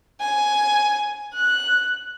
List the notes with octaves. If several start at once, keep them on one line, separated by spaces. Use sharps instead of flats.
G#5
F#6